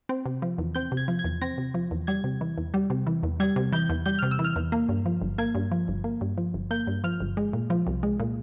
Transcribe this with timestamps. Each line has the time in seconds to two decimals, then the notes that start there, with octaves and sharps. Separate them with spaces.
0.09 C4
0.26 C3
0.42 F3
0.58 E2
0.75 C4 G6
0.92 C3
0.97 G#6
1.08 F3
1.19 G#6
1.24 E2
1.41 C4 A#6
1.58 C3
1.74 F3
1.91 E2
2.07 G3 G#6
2.24 C3
2.41 E3
2.58 E2
2.74 G3
2.90 C3
3.07 E3
3.23 E2
3.40 G3 G#6
3.56 C3
3.72 E3 G6
3.89 E2
4.06 G3 G6
4.19 C3 F6
4.31 E6
4.39 E3
4.44 F6
4.56 E2
4.72 A#3
4.89 G2
5.06 F3
5.22 G1
5.38 A#3 G#6
5.55 G2
5.71 F3
5.88 G1
6.04 A#3
6.21 G2
6.38 F3
6.54 G1
6.71 A#3 G6
6.87 G2
7.04 F3 F6
7.20 G1
7.37 G#3
7.53 A#2
7.70 F3
7.87 C2
8.03 G#3
8.20 A#2